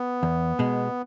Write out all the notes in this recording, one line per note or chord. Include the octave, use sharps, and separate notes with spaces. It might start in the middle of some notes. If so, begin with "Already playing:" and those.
Already playing: B3
E2
B2 G#3